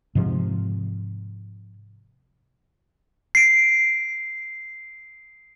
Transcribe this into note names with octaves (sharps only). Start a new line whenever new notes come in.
G#2 C3 F3
C7 D7